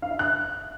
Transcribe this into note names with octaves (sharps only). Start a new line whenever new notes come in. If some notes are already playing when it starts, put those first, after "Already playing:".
F5
E5
F#6